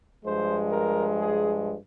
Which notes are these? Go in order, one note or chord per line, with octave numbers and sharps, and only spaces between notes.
G2 F3 G#3 C5
A#4
G#4